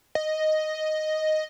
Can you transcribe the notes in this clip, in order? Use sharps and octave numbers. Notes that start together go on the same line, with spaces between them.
D#5